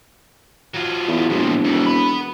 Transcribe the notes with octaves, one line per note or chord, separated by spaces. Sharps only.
F#3 F4
E2
E1 F2 A#2
F2 D#3
B3 B5